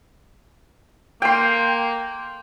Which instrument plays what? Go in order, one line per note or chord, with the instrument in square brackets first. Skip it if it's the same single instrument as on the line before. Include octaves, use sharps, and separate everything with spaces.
[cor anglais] A#3 [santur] G5 C6